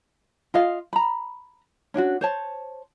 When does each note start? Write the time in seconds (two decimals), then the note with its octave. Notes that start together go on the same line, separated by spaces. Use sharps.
0.54 F4 D#5 F5
0.93 A#5 B5
1.94 C#4 D4 F4 F#4
2.21 C5 C#5 A5